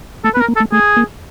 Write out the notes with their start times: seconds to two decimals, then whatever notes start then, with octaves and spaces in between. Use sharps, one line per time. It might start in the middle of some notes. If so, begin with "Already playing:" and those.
0.24 A3 A4
0.34 B3 B4
0.40 A#4
0.48 A#3
0.56 A4
0.60 A3
0.72 A3 G#4
0.97 A#3